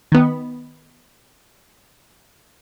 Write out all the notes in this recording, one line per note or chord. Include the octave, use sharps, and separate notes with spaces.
D#3 B3